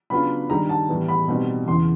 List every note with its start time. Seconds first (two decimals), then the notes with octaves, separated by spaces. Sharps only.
0.10 C#3 F#3 B3 D4 F4 B5
0.50 G2 D#3 G3 A#5
0.69 A5
0.89 A2 E3 G3 B3
1.08 B5
1.28 B2 G3 C4 D#4
1.67 E2 C#3 E3 C6